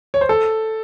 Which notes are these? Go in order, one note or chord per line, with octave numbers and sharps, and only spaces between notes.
C#5
C5
A4